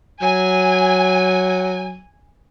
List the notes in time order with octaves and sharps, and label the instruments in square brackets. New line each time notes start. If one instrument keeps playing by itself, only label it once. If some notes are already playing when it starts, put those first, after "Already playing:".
[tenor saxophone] F#3 [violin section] G#5